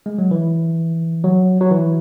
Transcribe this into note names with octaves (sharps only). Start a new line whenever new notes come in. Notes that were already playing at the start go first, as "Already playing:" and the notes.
G#3
F#3
E3
F#3
F#3
E3